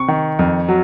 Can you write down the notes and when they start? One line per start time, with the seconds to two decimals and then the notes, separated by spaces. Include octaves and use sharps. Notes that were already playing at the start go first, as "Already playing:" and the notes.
Already playing: C3 C#6
0.08 D#3
0.39 F2
0.69 F#3